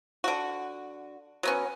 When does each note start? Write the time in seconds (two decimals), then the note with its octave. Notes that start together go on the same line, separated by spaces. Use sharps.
0.24 D3 F#4
1.43 F#3 B3 C#4